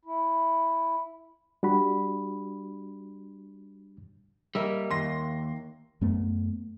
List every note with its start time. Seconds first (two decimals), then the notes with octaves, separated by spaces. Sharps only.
0.05 E4
1.63 G3 D4 F#4 B5
4.55 G3 A#3 D#5 E5
4.91 D#2 C6 A#6
6.01 F#2 A3 B3